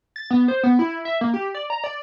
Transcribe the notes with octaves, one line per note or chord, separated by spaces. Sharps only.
A6
B3
C5
B3
E4
E5
A#3
G4
D5
A#5
D5